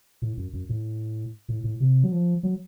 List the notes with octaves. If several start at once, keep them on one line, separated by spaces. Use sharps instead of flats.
A2
F#2
F#2
A2
A2
A2
C3
F#3
F3
F#3